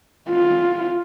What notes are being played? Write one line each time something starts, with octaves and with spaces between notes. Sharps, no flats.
F4